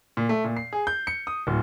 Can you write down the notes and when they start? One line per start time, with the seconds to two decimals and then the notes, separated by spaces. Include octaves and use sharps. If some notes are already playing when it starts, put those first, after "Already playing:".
0.17 A#2
0.29 A3
0.44 A#2
0.57 C7
0.73 G#4
0.87 G6
1.07 C#7
1.27 D#6
1.47 D1